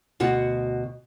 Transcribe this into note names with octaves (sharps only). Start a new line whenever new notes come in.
D2 B2 F#4 F#5